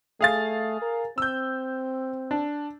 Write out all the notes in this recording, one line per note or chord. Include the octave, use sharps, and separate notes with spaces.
A3 G#4 F5 A6
A#4
C4 E6 G6
D4